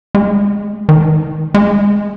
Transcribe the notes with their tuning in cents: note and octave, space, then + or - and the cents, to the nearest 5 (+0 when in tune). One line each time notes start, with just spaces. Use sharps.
G#3 -5
D#3 +30
G#3 +0